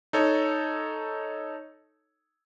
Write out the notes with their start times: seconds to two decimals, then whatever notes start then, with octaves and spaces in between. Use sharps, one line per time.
0.13 D#4 A4 C#5 D#5